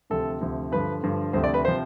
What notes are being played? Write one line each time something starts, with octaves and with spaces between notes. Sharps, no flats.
D2 C3 F3 A4
D2 C3 F3
G2 D3 F3 B4
G2 D3 F3
D2 C3 F3 C5
D5
B4
C3 F3 C5